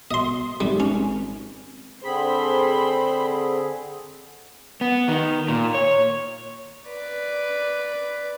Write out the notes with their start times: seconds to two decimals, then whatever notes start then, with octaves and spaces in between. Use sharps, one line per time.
0.11 B2 D#5 C6
0.60 G#1 G3
0.80 C#4
2.04 D3 C4 G#4 C5 B5
4.81 B3
5.08 D#3
5.48 A#2
5.74 C#5
6.88 B4 D5